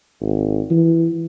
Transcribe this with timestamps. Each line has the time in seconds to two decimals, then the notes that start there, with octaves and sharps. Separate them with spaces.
0.21 G#1
0.71 E3